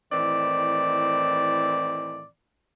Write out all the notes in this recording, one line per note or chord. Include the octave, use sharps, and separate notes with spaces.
A2 D#3 E3 C4 D5